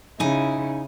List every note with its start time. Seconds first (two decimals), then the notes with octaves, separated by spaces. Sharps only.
0.20 C#3 D#4 E4 G#5